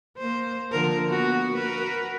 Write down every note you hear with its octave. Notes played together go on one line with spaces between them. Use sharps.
A#3 C5
D3 F3 A#4
A#3 B3 F#4
F#4 A#4 B4